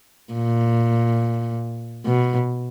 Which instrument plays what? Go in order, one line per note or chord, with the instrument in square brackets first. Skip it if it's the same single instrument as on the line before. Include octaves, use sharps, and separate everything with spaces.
[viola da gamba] A#2
B2